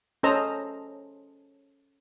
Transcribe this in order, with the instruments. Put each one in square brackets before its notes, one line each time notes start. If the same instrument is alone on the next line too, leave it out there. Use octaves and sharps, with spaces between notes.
[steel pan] C#4 A4 C5 D#5 A#5 E6